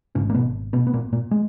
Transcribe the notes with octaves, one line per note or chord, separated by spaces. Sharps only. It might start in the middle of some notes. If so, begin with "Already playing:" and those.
G#1 G#2 C#3 C#4
A#3
B2 B3
B2 B3
B3
A#2 A#3
A#2 A#3
G#3